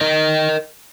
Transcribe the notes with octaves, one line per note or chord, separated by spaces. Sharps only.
D#4 A#4 D#5